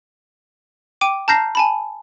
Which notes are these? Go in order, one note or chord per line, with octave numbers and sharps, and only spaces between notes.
G5 D6 D#7
A5 A#5 F6 G6 A#6 C7
G#5 A5 B5